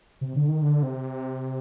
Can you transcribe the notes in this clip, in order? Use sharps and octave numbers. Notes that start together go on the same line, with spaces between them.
C3
D3
D#3
D3
C3